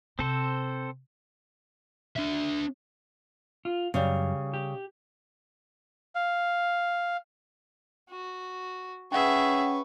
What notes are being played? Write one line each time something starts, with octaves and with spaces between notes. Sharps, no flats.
C3 C4 A4 C5
D4 E5
F4
F#2 C#3 G3
G4
F5
F#4
C#4 G#4 B4 E5 F#5 G5 C#6